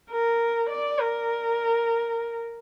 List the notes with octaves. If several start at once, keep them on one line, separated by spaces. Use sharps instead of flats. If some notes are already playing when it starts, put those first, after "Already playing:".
A#4
D5
A#4